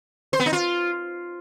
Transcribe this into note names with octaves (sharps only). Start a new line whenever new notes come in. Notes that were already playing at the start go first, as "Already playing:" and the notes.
C5
B3
D#4
F4